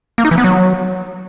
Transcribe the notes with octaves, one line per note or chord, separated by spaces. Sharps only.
A#3
D#4
E3
B3
F#3